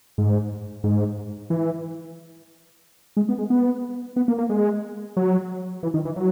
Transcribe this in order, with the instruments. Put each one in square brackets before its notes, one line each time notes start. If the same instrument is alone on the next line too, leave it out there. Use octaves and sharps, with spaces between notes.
[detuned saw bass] G#2
G#2
E3
G#3
B3
G#3
B3
B3
A#3
A#3
G#3
F#3
E3
D#3
E3
F#3